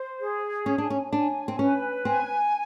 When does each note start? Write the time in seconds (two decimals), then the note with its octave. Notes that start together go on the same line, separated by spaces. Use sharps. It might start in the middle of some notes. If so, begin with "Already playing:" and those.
Already playing: C5
0.20 G#4
0.66 C#4 G#5
0.78 D4
0.90 C#4
1.12 D4 G#5
1.48 C4
1.59 C#4 B4
2.05 C4 G#5